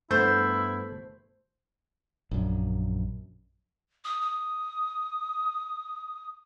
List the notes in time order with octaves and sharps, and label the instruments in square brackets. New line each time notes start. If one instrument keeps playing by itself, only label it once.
[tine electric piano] G2 B3 [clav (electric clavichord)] A3 [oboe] E4 [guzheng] C5
[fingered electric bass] A#1 F#2
[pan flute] D#6
D#6